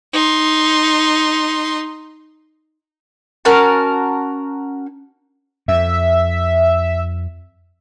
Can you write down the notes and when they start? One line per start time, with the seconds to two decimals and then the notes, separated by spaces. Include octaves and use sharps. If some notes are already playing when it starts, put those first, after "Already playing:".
0.13 D#4 C6
3.45 C#4 F#4 A#4 A5
5.68 F2 E5